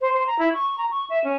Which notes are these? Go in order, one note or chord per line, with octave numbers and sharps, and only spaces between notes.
C5
C5
A#5
E4
C#6
A#5
C#6
E5
C#4